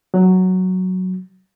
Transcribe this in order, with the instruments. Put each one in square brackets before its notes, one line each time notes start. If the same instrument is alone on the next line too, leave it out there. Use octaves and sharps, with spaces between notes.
[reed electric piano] F#3